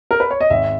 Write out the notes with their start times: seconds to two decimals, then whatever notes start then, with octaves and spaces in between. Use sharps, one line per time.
0.11 A#4
0.20 B4
0.31 C#5
0.41 D#5
0.50 G#1 E5